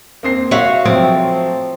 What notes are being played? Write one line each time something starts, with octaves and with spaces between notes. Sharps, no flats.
A#3 C4 C7
F#4 C#5 E5 F5
F3 F#3 A3 C4